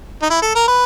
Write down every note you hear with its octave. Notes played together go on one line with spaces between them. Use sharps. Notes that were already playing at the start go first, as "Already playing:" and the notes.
D#4
E4
A4
A#4
B4